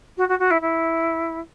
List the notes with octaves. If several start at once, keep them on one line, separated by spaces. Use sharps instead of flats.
F#4
F#4
F#4
E4
E4